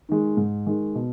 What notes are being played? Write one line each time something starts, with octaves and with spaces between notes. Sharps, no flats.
D#3 G#3
G#2
D#3 G#3
B2